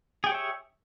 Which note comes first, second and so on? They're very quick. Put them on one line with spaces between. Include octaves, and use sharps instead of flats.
G#4 G5 G4 C#5 E5